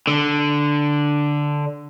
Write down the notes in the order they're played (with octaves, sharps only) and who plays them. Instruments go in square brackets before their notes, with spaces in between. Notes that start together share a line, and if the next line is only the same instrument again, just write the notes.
[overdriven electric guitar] D3